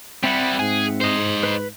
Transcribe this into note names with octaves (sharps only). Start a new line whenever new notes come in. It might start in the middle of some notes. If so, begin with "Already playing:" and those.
G3 C4 E4 E5 F#5
G#2 G#4
C5 D#5
B4 B5